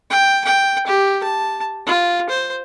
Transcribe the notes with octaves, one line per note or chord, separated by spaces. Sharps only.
G5
G5
G4
A5
F4
C5